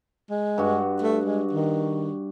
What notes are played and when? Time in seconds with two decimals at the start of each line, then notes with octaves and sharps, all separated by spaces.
0.30 G#3
0.58 G2 F#4
1.02 A3
1.25 G#3
1.53 D#3